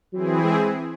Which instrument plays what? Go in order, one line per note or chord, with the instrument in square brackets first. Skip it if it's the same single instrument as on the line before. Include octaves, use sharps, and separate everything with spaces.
[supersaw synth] E3 C4 E4 G#4 [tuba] F#3
[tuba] G#3